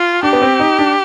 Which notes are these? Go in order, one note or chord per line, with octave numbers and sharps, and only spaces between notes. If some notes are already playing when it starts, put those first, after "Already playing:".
Already playing: F4
D4 G4
B3
C4
D#4
D4